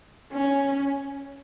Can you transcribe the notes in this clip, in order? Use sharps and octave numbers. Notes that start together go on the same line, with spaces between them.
C#4